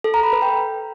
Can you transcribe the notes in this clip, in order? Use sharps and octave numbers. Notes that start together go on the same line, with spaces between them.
A4
A#5
B5
B4
G5